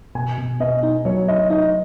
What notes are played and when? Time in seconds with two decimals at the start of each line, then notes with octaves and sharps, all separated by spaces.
0.15 B2 G#5
0.38 B2
0.60 B3 D#5
0.83 D#4
1.05 F#3 C#5
1.28 F#3 D#5
1.50 D#4 D#5